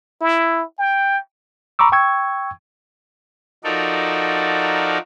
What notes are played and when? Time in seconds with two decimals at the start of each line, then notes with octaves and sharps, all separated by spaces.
0.21 E4
0.79 G5
1.79 A#5 B5 C#6 D6 E6
1.92 G5 C#6 E6 G#6
3.64 F3 D#4 F#4 A4 A#4 D5